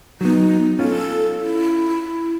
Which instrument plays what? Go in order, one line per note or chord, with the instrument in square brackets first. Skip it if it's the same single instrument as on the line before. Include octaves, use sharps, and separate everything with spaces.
[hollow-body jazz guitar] F#3 B3 [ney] D#4
[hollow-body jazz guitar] C#4 F4 [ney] A4
[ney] E4